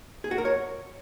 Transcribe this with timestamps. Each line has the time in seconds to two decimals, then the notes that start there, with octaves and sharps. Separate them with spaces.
0.24 G#4
0.31 F#4
0.38 A#4
0.45 C#5